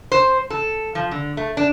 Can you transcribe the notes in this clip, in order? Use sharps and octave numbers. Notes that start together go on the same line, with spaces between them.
C5
A4
F3
D3
A3
D4